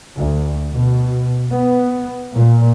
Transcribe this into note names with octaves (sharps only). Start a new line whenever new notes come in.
D2
B2
B3
A#2